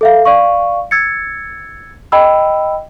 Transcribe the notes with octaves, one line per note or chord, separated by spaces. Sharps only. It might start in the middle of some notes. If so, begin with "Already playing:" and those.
A4 E5 F5
D5 F5 C#6
E6 G#6 A6 C#7
D#5 G5 B5 E6